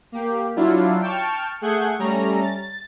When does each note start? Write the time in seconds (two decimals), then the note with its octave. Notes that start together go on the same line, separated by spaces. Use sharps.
0.12 A#3 G4
0.56 F#3 D4 E4 F4
1.02 G5 A5 C#6 F6
1.61 A3 G#4 F#5 G6 G#6
1.99 G3 A3 C#4 A#5
2.41 A6